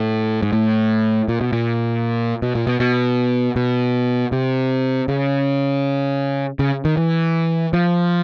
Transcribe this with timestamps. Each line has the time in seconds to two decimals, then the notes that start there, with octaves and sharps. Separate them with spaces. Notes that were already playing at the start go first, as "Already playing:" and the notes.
Already playing: A2
0.42 G#2
0.53 A2
1.28 A#2
1.41 B2
1.53 A#2
2.42 B2
2.55 A#2
2.67 B2
2.80 B2
3.56 B2
4.32 C3
5.08 C#3
6.59 C#3
6.85 D#3
6.97 E3
7.73 F3